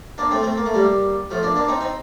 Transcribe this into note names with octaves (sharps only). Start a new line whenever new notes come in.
A#3 D4
A3 C4
A3 C4
A#3
A3
G3 A#3
F3 A3
A#3 D4
A#3 D4
C4 D#4
C4 D#4